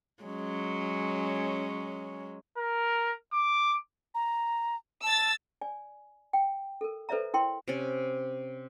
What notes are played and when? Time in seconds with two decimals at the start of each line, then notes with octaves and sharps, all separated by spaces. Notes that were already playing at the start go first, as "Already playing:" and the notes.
0.23 F#3 G#3 C#4
2.58 A#4
3.33 D6
4.15 A#5
5.03 A5 E6 A6
5.62 D5 G#5
6.33 G5
6.81 A4 A#4
7.09 A4 B4 C5 D5 E5 A#5
7.34 E4 A#4 G5 C6
7.68 C3 C#4